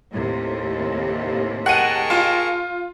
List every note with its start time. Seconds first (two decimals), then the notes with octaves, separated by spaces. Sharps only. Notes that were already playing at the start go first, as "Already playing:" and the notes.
0.12 D#2 A2 C3
1.66 G#4 A#4 D#5 F#5 G5 A5 C#6 D#7
2.10 F4